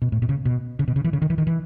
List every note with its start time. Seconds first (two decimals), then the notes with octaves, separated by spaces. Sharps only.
0.02 B2
0.12 A2
0.22 B2
0.29 C#3
0.45 B2
0.79 C#3
0.88 B2
0.96 C#3
1.04 E3
1.13 C#3
1.22 D#3
1.30 E3
1.38 D#3
1.47 E3